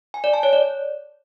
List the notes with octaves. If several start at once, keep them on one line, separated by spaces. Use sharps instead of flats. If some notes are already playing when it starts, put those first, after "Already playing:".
G#5
D5
A5
C#5
D5